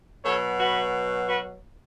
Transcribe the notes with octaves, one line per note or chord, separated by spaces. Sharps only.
B2 F#3 A4 C#5
F#4 B4
F#4 B4